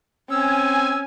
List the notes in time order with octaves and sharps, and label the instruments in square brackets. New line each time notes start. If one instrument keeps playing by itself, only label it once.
[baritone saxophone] C4 [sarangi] C#4 [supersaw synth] G#5 [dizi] E6